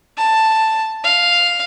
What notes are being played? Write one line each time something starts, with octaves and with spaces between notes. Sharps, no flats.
A5
F5